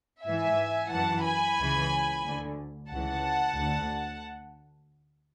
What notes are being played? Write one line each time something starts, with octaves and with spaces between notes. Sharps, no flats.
G#2 E3 E5 G#5
F#2 E3 F#5 A5
G#5 B5
C#2 C#3 E3
D2 D3
C#2 C#3 E3 F#5 A5
D2 D3